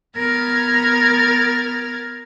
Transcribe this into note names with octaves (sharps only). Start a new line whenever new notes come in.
B3 A#4 F6 G#6 A6